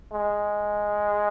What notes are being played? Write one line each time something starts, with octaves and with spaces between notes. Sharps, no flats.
G#3